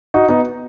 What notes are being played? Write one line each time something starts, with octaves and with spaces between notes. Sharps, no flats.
D#4 F#4
B3 D#4